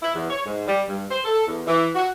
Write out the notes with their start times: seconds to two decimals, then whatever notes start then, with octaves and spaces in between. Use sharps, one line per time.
0.01 E4
0.14 E2
0.30 C#5
0.45 G#2
0.66 G3
0.88 G2
1.10 C5
1.25 A4
1.47 E2
1.67 E3
1.95 F#4